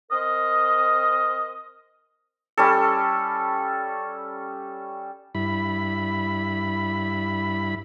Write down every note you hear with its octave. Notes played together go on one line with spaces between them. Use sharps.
C4 A#4 D#5
G3 C#4 A4
G2 E4 B5